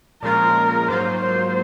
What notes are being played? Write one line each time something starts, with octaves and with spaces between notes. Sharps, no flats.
A#2 F3 G#3 C#4 F4 A#4
G#2 F#3 A#3 F4 C5
C5